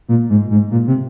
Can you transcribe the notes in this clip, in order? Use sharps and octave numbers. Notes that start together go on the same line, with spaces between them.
A#2
G#2
G#2
A#2
C3